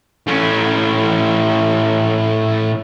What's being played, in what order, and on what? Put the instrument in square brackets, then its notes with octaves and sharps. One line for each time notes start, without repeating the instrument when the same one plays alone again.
[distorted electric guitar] A2 C#4